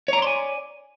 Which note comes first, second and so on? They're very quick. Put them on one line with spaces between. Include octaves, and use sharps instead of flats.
C#5 A#5 D5 C6 G#5